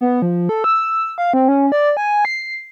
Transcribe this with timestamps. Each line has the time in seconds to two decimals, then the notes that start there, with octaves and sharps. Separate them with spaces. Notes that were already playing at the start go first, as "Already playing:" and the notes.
0.01 B3
0.22 F3
0.49 A4
0.64 E6
1.18 F5
1.34 C4
1.48 C#4
1.72 D5
1.97 G#5
2.25 C7